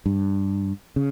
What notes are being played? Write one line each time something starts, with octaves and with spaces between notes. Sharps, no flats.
G2
C#3